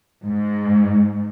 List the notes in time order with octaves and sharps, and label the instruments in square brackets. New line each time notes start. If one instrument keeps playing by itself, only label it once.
[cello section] G#2